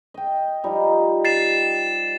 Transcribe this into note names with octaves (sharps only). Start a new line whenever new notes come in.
D#5 G5
F3 G3 D#4
A6 C7 E7